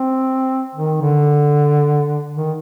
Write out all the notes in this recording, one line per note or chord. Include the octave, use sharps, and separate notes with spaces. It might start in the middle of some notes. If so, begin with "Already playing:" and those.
Already playing: C4
D#3
D3
D#3